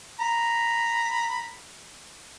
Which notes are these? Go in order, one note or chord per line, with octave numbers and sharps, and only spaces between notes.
A#5 B5